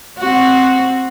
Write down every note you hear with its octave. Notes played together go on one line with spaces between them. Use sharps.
C4 F#4